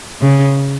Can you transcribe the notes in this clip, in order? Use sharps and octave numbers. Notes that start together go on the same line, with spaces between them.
C#3